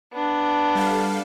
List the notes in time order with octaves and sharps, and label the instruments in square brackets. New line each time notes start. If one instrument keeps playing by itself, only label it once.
[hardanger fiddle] B3 D4
[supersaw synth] G3 A4 F5